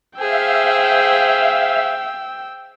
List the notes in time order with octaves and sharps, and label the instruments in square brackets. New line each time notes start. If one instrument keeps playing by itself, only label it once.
[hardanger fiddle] G#4 C5 [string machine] E5 F5 [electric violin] G5 E6